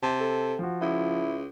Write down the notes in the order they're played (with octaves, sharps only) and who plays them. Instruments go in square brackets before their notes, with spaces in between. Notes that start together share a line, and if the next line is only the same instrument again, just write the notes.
[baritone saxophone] C3 [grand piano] A5
[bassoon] A4
[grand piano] F3 F#4
[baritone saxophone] C#2 [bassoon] E4